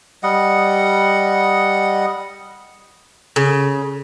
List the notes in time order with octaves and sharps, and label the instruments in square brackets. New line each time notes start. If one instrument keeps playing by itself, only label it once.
[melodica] G3 D#5 F#5
[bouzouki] C#3